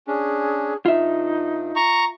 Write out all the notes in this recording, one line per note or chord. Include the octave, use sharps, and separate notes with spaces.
C#4 D4 G#4
G2 D#4 F4 E5
A#5 C#6